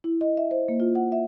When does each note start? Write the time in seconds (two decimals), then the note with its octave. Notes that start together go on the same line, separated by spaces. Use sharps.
0.04 E4
0.21 D#5
0.37 E5
0.51 C5
0.68 A#3
0.80 F4
0.95 F#5
1.12 E5